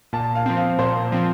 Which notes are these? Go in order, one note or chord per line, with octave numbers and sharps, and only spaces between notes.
A#2 A5
F5
F3 C4
F5
A#2 C5
F3 C4